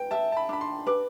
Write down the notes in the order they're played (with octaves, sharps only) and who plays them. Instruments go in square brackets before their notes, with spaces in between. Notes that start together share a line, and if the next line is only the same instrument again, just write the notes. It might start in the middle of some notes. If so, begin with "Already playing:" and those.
Already playing: [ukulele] B4 [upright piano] G5
[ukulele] E5 [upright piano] A5
[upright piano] A5
B5
[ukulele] D4 [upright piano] B5
[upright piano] C6
[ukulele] B4 [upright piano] D6